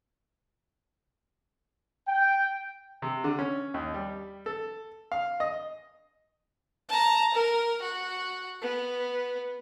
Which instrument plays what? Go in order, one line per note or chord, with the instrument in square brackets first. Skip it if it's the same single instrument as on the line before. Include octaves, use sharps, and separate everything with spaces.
[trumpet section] G5
[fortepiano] C3
D3
C#4
D#2
G3
A4
F5
D#5
[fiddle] A5 A#5
A#4
F#4
B3